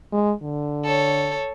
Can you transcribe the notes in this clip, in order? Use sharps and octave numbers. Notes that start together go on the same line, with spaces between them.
G#3
D3
A4 C#5